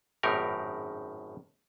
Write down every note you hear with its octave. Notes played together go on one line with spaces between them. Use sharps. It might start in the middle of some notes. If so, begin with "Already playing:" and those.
G#1 F#2 A2 D#4 G4 A#4